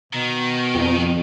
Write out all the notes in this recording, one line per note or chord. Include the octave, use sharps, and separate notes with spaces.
B2 D#3
F2